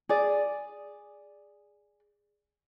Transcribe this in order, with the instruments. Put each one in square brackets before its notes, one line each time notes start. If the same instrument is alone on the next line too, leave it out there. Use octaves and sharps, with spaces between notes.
[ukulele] G#4 D5